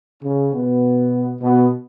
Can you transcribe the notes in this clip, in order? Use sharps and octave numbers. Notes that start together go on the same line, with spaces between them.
C#3 C#4
B2 B3
B2 B3